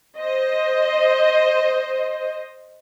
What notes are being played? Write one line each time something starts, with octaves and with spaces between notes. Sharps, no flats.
C5 D#5